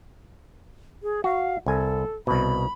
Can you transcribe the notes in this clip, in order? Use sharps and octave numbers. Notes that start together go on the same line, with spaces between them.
G#4
F#4 F5
C2 A4 G#5
C2 B2 B5